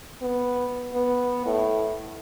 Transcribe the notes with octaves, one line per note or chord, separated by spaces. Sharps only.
B3
B3
A2